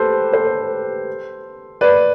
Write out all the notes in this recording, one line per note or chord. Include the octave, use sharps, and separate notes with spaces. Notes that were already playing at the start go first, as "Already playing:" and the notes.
Already playing: G4 A4 B4 C5
A4 C5
B4 D5